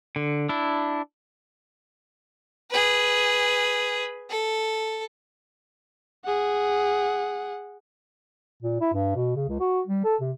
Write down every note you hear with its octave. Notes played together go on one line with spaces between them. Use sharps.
D3
D4 E4
G#4 B4
A4
G#4 F#5
A#2
E4
G2
B2
C#3
C#2
F#4
G3
A4
C3